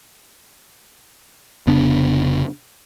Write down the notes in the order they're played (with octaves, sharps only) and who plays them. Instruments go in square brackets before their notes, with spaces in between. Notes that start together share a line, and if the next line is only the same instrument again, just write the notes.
[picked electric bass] F1 C#3 B3 D4